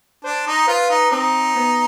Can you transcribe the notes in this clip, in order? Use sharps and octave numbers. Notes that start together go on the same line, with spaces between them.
D4 C5
D#4
F4 B4
D#4
C4 D#4
B3